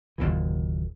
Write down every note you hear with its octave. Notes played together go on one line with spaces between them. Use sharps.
F#1 D#2 A#2 E3